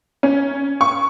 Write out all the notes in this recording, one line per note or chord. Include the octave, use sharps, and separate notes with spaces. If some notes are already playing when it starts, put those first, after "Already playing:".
C#4
C#6